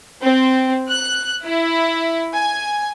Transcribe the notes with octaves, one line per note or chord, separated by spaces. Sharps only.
C4
F#6
E4
G#5